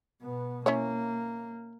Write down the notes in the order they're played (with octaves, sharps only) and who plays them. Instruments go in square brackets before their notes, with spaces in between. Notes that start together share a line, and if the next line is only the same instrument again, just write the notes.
[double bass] B2 B3
[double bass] A#3 [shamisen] C#4 E4 C#5